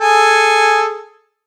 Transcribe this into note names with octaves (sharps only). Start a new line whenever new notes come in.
G#4 A4 G#5